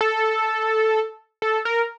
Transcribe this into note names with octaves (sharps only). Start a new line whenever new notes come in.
A4
A4
A#4